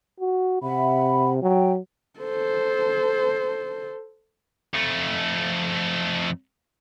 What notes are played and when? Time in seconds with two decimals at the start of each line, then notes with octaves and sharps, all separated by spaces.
0.20 F#4
0.62 C3 E5 F#5 B5
1.42 F#3 G5
2.20 A4 C5
4.74 F2 A3